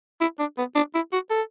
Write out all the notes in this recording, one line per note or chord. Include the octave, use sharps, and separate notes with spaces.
E4
D4
B3
D4
E4
F#4
A4